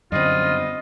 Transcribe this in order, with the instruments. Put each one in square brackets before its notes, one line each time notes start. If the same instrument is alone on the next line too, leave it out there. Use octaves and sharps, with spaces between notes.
[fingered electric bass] F#2 D3 [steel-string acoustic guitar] G3 B3 C4 [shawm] F4 [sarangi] D#5